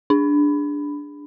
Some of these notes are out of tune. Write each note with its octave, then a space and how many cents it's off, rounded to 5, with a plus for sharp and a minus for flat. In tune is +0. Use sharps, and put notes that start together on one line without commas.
D4 -5